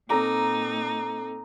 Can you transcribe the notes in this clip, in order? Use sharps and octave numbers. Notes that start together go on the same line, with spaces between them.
A#2 C4 D#4 A4 A#5 D6